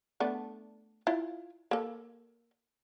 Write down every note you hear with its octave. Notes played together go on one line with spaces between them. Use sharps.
A3 B3 D4
E4 F4
A#3 A4